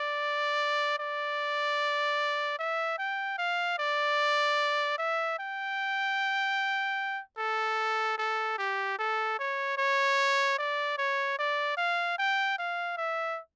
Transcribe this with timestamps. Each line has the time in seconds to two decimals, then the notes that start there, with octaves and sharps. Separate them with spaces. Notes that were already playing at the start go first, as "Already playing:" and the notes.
Already playing: D5
0.99 D5
2.59 E5
2.99 G5
3.38 F5
3.78 D5
4.98 E5
5.39 G5
7.38 A4
8.18 A4
8.58 G4
8.99 A4
9.39 C#5
9.78 C#5
10.59 D5
10.98 C#5
11.39 D5
11.77 F5
12.19 G5
12.58 F5
12.97 E5